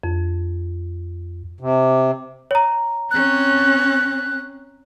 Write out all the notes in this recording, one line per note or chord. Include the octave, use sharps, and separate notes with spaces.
F2
C3
C#5 A#5
C4 C#4 F#6